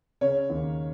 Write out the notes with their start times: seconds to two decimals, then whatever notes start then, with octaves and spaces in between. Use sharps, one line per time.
0.21 C#3 C#5
0.50 D#2